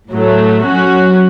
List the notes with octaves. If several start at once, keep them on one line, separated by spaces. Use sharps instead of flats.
A2 F#3 A3
F#3 C#4 F#4